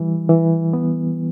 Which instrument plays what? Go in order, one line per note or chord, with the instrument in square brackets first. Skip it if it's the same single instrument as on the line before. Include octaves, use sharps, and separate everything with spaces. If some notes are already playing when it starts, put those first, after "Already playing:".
Already playing: [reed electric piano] E3 G3
E3
B3